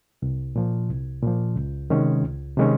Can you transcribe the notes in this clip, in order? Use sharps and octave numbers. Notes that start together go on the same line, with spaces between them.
C2
A#2 F3
C2
A#2 F3
C#2
C3 D#3 G#3 C#4
C#2
C3 D#3 G#3 C#4